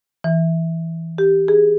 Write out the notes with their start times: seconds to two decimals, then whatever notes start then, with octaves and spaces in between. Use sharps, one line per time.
0.24 E3
1.18 G4
1.48 G#4